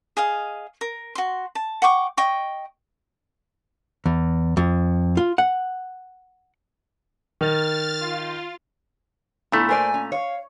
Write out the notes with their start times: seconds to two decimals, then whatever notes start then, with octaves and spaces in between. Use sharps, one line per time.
0.17 G#4 D#5 F5
0.81 A#4
1.15 F#4 C6
1.55 A5
1.82 F#5 G5 C#6 D6
2.17 D#5 G5 C#6
4.06 E2
4.57 F2
5.17 F4
5.38 F#5
7.41 D#3 F6 A6
8.01 F4
9.52 A#2 A3 B3 E4 A4
9.69 A#4 C5 D5 G#5
9.94 C#4
10.12 C#5 F5